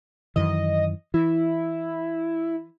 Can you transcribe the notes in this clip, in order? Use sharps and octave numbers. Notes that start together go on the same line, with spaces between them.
F#2 D#3 E3 D#5
E3 E4